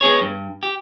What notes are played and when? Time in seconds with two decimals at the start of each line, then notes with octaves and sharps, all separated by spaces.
0.01 G#3 B3 G#4 C#5
0.21 G2
0.63 G4